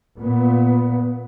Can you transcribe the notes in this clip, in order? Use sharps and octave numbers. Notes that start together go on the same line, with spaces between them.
A#2 B3